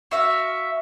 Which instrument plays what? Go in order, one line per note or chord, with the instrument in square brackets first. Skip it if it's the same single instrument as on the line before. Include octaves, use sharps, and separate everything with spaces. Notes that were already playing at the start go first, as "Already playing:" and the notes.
[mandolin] F#4 E5 F5